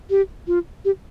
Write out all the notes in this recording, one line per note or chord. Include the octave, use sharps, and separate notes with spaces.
G4
F4
G4